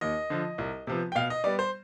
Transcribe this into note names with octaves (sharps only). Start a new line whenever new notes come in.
D#2 D#5
D3 F3
C2
C3 F3 B3
G5
B2 F5
D#5
G3 B3 D5
C5